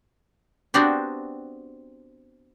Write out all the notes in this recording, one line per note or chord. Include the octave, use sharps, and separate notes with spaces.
B3 C4 D4 F#4 G4 C5